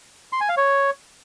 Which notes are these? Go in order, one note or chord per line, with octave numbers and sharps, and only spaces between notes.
C6
G#5
F5
C#5